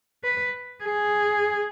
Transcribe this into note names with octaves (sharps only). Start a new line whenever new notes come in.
B4
G#4